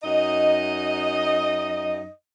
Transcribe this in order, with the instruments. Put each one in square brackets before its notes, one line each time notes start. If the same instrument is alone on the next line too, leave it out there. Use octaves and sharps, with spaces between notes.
[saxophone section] F#2 D#4 D#5